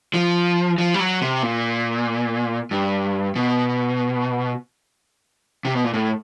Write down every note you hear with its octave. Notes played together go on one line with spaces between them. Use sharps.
F3
F3
G3
F#3
C3
A#2
G2
B2
C3
B2
A#2
A2